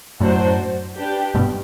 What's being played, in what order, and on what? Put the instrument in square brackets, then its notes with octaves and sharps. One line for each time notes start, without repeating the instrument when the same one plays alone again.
[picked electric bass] F#2 A2 [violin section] D4 F#4 C5
[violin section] D4 G4 B4
[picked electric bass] G2 B2